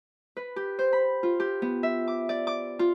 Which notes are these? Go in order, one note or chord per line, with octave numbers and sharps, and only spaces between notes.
B4
G4
C5
B5
F4
G4
B3
E5
D6
D5
D6
F4